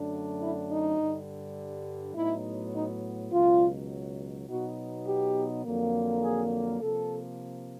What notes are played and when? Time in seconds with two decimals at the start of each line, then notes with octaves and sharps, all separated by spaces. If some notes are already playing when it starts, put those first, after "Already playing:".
Already playing: F#2 D3 F#3 A3 D4
0.41 E4
0.69 D#4
0.99 G2 D3 G3
2.15 A2 F#3 B3 D#4 E4
2.73 D#4
3.31 C#2 B2 F#3 F4
4.48 B2 F#3 B3 D#4 F#4
5.06 G4
5.65 F2 D3 F#3 A#3
6.23 G#4
6.81 C3 F3 A#3 A4